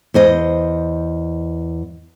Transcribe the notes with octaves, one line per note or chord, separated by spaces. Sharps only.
E2 C5 D#5